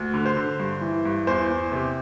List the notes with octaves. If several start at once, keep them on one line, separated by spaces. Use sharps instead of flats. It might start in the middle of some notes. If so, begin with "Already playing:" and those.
Already playing: D2
D3
C5
D3
G2
E3
G2
E2 C5
E2
C3